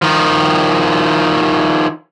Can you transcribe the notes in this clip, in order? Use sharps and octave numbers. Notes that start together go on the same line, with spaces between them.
D#3 F3